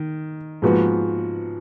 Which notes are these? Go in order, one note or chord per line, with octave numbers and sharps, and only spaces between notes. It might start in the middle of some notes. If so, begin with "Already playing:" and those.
Already playing: D#3
G#2 F3 B3 F#4